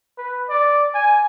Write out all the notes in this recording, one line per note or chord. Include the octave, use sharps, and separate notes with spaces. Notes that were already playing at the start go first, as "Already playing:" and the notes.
B4
D5
G#5